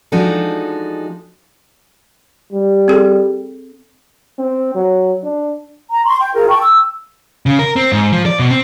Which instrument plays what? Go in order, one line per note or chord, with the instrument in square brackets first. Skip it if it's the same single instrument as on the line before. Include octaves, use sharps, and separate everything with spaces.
[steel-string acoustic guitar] F3 G#3 D4 D#4 F#4 A4
[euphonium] G3
[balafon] C4 G#4 A4
[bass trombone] C4
F#3
D4
[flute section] A#5
C6 C#6
G5
F4 G#4 A#4
G5 A5 C#6
E6
[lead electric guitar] C#3
A#4
C4
G#2
F3
D5
B2
C4